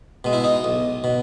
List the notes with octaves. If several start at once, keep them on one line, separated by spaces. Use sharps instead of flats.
B2 G#3
E4
D#4
B1
B2